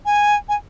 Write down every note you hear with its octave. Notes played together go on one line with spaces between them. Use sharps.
G#5
G#5